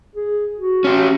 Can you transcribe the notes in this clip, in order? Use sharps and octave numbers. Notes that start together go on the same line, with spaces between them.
G#4
F#4
C#4 G4